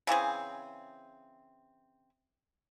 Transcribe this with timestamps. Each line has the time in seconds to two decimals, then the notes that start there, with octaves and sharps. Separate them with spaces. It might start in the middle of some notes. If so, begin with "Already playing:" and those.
0.07 C#3 E3 C4 G#4